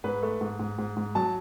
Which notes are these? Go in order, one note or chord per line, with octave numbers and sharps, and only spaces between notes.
G#2 B4
A3
G#2
G#2
G#2
G#2
F#3 A5